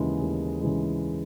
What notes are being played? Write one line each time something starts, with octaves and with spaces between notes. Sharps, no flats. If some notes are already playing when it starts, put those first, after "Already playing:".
Already playing: D#2 C#3 E3 G#3
D#2
C#3 E3 G#3